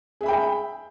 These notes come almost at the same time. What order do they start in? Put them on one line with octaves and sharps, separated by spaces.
G#4 E5 B5 G5